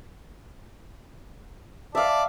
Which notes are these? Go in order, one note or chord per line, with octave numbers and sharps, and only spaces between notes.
D5 E5 F5 A5